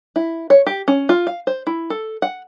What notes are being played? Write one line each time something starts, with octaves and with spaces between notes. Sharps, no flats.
E4
C#5
G4
C#4
F4
F5
C5
E4
A4
F#5